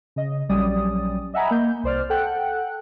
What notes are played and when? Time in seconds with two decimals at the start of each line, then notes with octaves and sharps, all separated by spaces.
0.16 C#3 D#5
0.49 A#1 F#3 G3 C#4 D5 D#6
1.34 D#5 E5 F#5 G#5 A#5 B5
1.51 A#3 G6
1.84 C2 C5 D5 F6
2.10 A4 F#5 G5 F#6